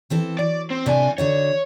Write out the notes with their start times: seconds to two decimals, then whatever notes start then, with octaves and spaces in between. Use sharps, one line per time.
0.10 E3 C4 A4
0.39 F#3 D5
0.71 C4
0.86 F#2 A2 C3 D4 G#5
1.18 D3 D#4 F#4 C#5